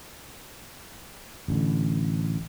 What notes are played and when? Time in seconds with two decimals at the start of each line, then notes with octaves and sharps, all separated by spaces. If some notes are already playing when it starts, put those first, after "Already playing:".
1.48 A1 D3